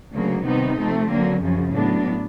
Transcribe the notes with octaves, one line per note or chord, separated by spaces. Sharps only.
D2 C#3 F#3 A#3
C3 D#3 G3 B3 D#4
C3 F3 A3 C4
D3 F#3 A#3
F#2 C#3 F3
A2 F#3 B3 D4